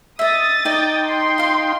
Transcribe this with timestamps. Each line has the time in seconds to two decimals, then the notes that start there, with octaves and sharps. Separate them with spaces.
0.19 D#5 E5 D#6 A6
0.65 D#4 D5 D#5 G5
1.05 C6
1.38 F4 F5